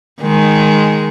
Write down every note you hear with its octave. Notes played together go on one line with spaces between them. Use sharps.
D#3 G#3